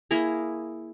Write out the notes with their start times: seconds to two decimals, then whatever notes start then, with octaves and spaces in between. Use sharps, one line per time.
0.11 A#3 E4 G#4 A#5